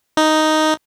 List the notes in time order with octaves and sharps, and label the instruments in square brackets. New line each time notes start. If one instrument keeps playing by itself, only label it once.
[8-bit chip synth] D#4